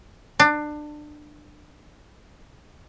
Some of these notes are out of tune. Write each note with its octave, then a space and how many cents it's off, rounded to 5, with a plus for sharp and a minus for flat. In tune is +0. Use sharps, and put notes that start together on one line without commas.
D4 +25